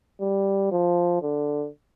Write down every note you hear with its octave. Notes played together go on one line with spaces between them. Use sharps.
G3
F3
D3